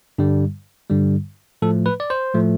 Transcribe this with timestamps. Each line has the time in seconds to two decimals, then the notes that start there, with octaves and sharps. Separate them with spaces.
0.18 G2 D3 G3
0.90 G2 D3 G3
1.62 A2 F3 A3 A4
1.86 B4
2.00 D5
2.10 C5
2.34 A2 F3 A3